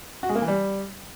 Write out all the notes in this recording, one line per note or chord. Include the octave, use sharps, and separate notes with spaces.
F#4
G#3
A#3
E3
G3